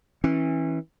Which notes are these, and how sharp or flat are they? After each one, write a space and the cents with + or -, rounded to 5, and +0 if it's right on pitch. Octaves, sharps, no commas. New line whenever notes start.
E3 -20 C#4 -30